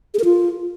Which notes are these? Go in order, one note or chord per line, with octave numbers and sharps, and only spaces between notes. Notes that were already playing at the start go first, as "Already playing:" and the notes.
G#4
A#4
F4